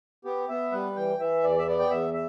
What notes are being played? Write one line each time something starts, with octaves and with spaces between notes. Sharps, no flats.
B3 G4
B3 E5
G3 B4
E3 G5
E3 E5
E2 D5
E5
B3 D5
G5
E2 E5
E5